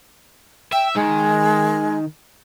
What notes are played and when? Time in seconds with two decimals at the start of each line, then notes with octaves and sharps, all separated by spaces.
0.72 E5 G5
0.95 D#3 G#3